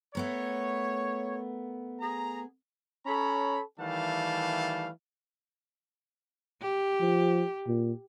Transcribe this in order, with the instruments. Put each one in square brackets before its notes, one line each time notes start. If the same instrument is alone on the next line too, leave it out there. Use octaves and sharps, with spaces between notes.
[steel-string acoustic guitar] A3 B3 A#4 [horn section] C#5
[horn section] G#4 A#5
C#4 A4 C#5 A#5 B5
D#3 E3 G3 A3 F5 A5
[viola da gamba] G4
[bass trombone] F3
A#2